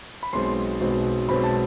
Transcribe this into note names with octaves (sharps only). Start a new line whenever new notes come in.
B5
B1 B2 G#3 C4 C6
B1 B2 G#3 C4
B1 B2 G#3 C4 B5
A5